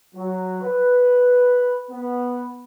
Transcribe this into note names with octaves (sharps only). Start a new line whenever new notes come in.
F#3
B4
B3